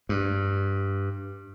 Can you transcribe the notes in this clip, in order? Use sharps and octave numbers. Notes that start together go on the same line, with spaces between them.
G2